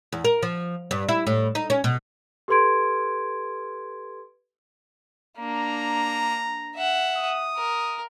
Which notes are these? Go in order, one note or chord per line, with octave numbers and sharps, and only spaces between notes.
E2
A#4
F3
G2
E4
A2
D#4
C#4
B2
G4 A4 B4 C6 G#6 D7
A#3 D4 A#5
E5 F#5
D#6
A#4